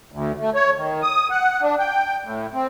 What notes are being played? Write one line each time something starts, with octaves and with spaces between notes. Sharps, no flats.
D2
A3
C#5
D#3
D#6
F#5
D4
G5
A2
C4